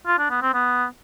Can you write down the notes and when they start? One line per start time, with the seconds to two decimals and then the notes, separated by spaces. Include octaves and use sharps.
0.07 F4
0.19 D4
0.30 B3
0.42 C4
0.54 B3